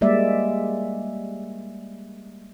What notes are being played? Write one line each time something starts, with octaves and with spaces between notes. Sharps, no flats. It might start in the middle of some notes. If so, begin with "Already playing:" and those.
G3 G#3 A#3 D5 E5